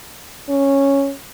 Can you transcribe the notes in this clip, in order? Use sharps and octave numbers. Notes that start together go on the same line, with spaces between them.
C#4